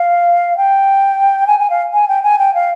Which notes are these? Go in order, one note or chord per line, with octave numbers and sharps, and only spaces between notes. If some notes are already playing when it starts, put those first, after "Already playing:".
Already playing: F5
G5
G#5
G#5
F5
G#5
G5
G#5
G5
F5